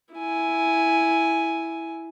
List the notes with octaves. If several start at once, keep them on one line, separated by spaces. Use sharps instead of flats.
E4 G#5